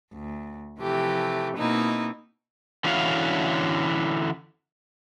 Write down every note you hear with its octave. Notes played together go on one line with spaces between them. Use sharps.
D2
C3 E3 F3 A3 G4
B2 A#3 C4 D#4 E4
D3 E3 C#4 E4 F#4 F5